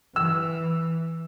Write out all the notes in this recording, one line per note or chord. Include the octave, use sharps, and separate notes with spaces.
E3 E6